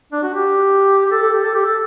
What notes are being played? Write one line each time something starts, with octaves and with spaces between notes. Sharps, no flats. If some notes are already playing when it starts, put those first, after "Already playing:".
D4
F#4
G4
G4
A4
A4
G4
A4
G4
A4